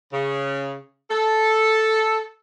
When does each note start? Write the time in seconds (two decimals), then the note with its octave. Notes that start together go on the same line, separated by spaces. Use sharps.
0.13 C#3
1.10 A4